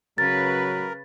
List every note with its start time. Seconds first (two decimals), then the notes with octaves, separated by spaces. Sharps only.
0.18 C#3 F#3 A#4 B4 A6